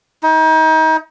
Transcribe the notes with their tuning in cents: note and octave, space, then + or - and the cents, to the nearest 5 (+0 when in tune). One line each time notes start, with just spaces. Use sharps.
D#4 +35